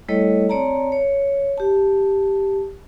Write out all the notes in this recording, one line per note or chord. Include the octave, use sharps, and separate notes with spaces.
G3 A3 E4 A4 C#5 D#5
C4 C#5 D5 A5 A#5
C#5
G4 A5